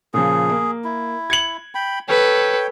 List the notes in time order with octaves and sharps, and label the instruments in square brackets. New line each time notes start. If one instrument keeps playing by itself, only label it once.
[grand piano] A#2 C#3 F3 [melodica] G#4
[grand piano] A#3
[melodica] E4
[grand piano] G#6 C#7 F#7
[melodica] G5 B5
[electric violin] A4 B4 [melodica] C#5 G5